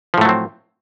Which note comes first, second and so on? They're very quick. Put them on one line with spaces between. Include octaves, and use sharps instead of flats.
F3 A2 A3 F#3 C4